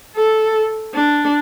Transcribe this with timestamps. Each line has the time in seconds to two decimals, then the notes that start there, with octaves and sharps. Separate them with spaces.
0.16 A4
0.94 D4